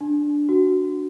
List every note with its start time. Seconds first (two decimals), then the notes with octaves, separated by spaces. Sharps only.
0.01 D4
0.49 F#4